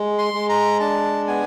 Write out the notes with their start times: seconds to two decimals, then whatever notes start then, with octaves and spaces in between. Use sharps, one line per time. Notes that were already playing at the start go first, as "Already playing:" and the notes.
Already playing: G#3
0.18 C6
0.33 G#3
0.49 A#5
0.80 D4 A5
1.27 B3 G#5